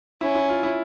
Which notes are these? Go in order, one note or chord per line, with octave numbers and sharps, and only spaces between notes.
C#4 E4
E4
F4
E4